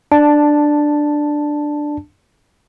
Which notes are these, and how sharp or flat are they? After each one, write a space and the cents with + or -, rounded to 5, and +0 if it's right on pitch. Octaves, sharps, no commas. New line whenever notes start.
D4 +10 A5 +0